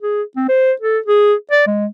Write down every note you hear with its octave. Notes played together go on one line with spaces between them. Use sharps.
G#4
C4
C5
A4
G#4
D5
G#3